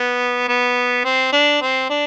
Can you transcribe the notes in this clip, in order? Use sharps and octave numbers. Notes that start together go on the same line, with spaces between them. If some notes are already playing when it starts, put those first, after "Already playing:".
Already playing: B3
B3
C4
D4
C4
D4